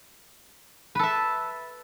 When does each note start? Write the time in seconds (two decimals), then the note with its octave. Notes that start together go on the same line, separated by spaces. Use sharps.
0.95 B4
0.99 A4
1.03 E5